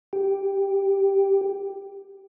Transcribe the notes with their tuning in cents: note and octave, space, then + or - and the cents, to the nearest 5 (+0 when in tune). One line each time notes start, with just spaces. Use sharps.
G4 +0